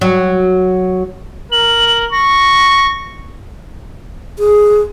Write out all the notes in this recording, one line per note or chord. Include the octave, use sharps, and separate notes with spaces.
F#3
A#4 F#7
C#6 A#6
G#4